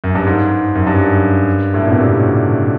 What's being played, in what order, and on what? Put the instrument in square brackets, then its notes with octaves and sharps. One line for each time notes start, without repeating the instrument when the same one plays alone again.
[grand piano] F#2
G2
G#2
F#2
G2
A2
A#2
B2
C3
C#3